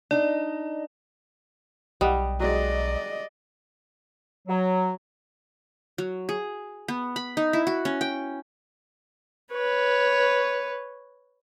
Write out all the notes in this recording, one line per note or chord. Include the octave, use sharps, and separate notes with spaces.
D4 D#4 D5 D#5
B1 G3 D#5 F#5
F#3 G#3 D5 D#5
F#3
F#3
G#4
B3
B5
D#4
E4
F#4
C#4
G5
B4 C#5